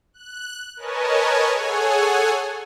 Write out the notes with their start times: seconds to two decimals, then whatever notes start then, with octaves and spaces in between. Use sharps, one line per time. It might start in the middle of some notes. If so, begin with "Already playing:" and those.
0.13 F#6
0.77 A#4 B4 C#5 D#5 G#5 A5
1.53 G#4 A4 C#5 F#5 G#5